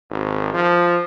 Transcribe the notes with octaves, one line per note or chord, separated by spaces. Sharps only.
G#1
F3